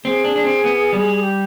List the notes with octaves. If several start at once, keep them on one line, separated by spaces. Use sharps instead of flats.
C4 G#4
D4
D4
C4
B3
G3
G4